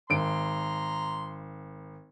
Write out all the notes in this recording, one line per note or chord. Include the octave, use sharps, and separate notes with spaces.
G#1 A#5 C6 D7